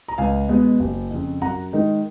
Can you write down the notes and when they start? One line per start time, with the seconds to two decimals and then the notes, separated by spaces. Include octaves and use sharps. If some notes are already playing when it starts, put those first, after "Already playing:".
0.08 A#5
0.18 C#2 F5 G#5
0.49 B2 G#3 B3
0.80 F#1
1.11 F2 C#3
1.42 F#2 F#5 A#5
1.73 D#3 G#3 D#4